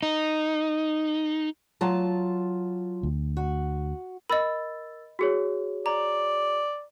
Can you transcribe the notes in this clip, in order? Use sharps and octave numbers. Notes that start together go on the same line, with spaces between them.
D#4
F#3 F4 A5
D2
F#4
A#4 D#5 B5 E6 A6
F#4 G#4 C#5
D5 A#5